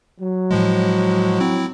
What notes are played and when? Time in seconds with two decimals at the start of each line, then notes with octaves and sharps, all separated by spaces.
0.19 F#3
0.51 A2 F3 G#3
1.40 C4 E4